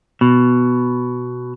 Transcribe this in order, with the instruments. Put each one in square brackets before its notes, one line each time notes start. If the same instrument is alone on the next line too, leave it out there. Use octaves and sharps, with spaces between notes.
[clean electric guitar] B2